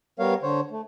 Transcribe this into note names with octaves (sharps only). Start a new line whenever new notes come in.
G3 B3 A#4 C#5 F5
D3 C5 C#5
A3